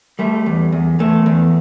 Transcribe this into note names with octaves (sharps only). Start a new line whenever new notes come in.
G3 A3
E2
E2
E2 A3
E2